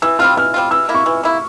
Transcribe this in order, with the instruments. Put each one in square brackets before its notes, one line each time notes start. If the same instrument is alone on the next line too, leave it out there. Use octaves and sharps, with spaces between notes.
[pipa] E3 [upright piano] E6
[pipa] G3 C4 F4 [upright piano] F6
[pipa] E3 [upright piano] F6
[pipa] G3 C4 F4
[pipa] E3 [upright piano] E6
[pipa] A#3 E4
[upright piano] C#6
[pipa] E3
A#3 E4